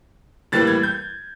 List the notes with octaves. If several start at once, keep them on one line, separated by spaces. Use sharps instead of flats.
A2 E3 G3 A#3 A6
G#6
G6